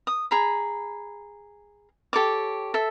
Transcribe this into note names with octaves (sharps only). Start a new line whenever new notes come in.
D#6
G#4 A#5 B5
G4 A4 C#5 D6
A4 E5